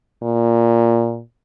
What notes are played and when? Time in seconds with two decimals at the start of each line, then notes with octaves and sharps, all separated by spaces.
0.23 A#2